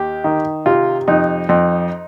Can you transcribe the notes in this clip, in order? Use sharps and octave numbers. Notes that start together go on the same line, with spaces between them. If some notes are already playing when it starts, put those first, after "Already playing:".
Already playing: D#2 G4
D#3
C3 F4
F2 D#4
F2